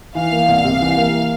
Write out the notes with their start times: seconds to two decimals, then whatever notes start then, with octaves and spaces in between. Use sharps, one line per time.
0.15 E3 F5
0.31 A#3
0.48 C2
0.65 C3
0.81 E3
0.96 A#3